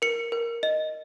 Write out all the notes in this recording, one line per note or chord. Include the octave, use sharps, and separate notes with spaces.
A#4 C#7
A#4
D#5